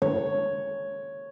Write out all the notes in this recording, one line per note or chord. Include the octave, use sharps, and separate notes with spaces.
C#5